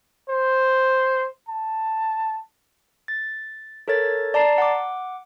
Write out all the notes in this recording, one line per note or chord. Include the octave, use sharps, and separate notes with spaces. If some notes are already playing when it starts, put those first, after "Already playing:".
C5
A5
A6
A4 A#4 C#5 A6
D5 A5 A#5 C7
F#5 D6